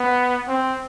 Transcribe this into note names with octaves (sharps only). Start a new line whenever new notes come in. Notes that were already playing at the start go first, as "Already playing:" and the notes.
Already playing: B3
C4